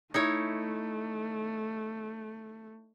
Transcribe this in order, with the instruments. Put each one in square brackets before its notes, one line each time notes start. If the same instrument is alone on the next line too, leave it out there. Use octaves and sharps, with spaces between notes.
[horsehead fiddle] A3 [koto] D#4 E4 C#5